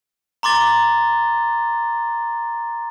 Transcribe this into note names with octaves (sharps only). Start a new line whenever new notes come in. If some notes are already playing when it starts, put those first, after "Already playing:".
A#5 C6 D6 A6 G7